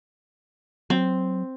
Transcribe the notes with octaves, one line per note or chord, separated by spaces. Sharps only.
F#3 C4